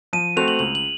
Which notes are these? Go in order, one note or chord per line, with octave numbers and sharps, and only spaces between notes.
F3 D#7
A3 C4 F#4 C5 F7
F#7
C#2 F#7
F#7